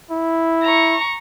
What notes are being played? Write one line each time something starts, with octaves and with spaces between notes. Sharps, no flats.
E4
A#5 C#6